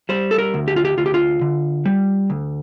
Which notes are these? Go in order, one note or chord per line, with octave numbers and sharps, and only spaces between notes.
G3 C5
A4
A#4
D2
G4
F4
G4
D2 F4
G4
F4
D3
G3
D2